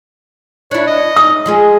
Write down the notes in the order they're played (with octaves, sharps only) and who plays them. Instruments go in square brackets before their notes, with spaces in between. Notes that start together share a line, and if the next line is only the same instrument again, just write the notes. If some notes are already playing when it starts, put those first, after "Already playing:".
[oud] D4 E4 [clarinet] C#5
[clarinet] D#5
[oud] D#4 [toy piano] D#6
[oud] F3 G#3 G#4